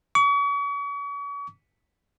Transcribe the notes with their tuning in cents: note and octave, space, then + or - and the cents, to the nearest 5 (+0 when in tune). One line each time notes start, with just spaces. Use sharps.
C#6 +40